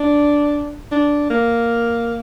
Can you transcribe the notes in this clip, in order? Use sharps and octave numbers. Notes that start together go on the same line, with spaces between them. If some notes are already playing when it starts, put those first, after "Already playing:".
Already playing: D4
D4
A#3